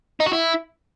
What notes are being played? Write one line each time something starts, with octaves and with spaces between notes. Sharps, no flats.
D#4
F#4
E4